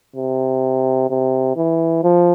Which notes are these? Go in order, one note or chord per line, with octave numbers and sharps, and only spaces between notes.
C3
C3
E3
F3